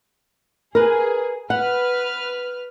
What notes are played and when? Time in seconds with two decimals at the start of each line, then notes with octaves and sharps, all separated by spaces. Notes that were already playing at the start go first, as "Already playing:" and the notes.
0.75 G#4 A#4 B4
1.50 B4 F#5 F6